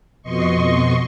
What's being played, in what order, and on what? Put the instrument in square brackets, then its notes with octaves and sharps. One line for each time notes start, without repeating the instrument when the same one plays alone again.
[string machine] F2 B2 D#5 C6 C#6